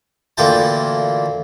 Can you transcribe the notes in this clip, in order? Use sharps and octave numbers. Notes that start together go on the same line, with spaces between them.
D2 A#2 E3 F4 G5 A5